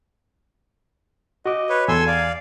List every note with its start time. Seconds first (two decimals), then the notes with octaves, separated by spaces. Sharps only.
1.46 F#4 D#5 D6
1.69 B4 C#5
1.88 E2 A4 G#5 C6 E6
2.07 D5 F5